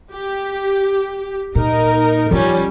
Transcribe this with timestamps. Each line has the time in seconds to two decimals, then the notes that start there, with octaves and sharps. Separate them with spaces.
0.13 G4
1.55 A#2 D#4 A#4
2.31 F3 G3 C#4 F4